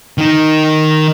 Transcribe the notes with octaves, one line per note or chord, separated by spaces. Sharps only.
D#3 D#4